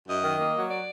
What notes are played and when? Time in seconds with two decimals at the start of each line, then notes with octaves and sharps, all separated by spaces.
0.07 F#2 D#5
0.22 D#3
0.39 A#3
0.54 F#3
0.69 D5